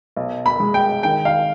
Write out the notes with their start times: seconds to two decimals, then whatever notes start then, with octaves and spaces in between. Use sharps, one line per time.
0.17 B1
0.46 B5
0.60 G#3
0.74 G5
1.03 D#3 G5
1.25 F5